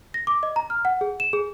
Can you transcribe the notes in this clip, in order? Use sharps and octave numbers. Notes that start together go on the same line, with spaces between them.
A#6
D6
D#5
A#5
F6
F#5
G#4
E7
G#4